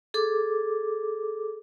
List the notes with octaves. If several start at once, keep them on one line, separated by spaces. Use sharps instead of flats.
G#4 A4 D6